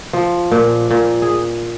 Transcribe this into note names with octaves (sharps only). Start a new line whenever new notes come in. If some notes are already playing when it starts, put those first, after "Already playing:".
F3
A#2
A#2
G#4